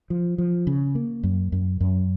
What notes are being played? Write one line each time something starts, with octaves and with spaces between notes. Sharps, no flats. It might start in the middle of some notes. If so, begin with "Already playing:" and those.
F3
F3
C#3
A#3
F#2
F#2
F#2